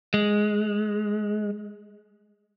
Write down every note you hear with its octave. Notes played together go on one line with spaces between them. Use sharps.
G#3